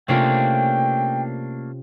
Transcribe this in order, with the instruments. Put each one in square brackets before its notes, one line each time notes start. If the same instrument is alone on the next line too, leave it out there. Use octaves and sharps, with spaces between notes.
[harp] C3 C#4 F4 [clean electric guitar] A3 A#3 D4 [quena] G5